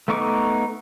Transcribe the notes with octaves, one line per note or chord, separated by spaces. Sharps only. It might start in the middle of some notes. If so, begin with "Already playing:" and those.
A3 B3 D#4 C#6 D6